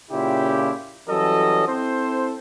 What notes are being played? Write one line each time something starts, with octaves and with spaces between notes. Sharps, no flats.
A#2 C#3 E4 F4 G4
E3 F#3 G3 C#4 A4 D#5
C4 E4 A4 C5